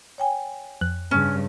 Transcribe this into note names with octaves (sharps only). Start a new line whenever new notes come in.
C#5 G5 G#5
F2 F#6
G2 C#3 C#4